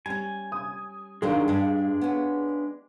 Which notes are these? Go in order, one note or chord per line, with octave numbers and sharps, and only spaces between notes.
G3 C#4 G#5
D#6
D#3 F#3 G#3 A#3 D4 G4 G#4 F5
G2
B3 C#4